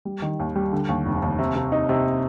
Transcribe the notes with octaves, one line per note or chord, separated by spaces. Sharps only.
G3
D#3
D#2
G3
D3
D#2
F1
D#2
C3
C3
D#4
C3